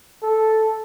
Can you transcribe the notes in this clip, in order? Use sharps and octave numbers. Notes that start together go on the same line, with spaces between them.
A4